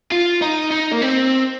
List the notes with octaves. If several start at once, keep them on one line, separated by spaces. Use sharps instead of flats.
F4
D#4
D#4
A#3
C4